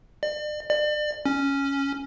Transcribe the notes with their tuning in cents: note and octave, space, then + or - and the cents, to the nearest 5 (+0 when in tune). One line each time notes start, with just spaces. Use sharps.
D5 +40
D5 +35
C#4 +0